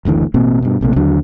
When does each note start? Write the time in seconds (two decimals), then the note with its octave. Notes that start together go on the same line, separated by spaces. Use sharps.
0.05 F#1 D2 D3 E3
0.34 A1 B2 A#3 C4
0.62 G2 B2
0.81 A#1 C3 A3 A#3
0.96 D#2 D3 F#3 D4